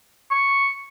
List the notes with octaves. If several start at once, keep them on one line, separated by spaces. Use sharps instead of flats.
C#6